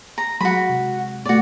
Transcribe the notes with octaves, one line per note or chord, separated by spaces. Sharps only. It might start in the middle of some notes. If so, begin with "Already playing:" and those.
A#5
F#3 G#3 F#4 B5
C3
A#2 A3 F#4 D5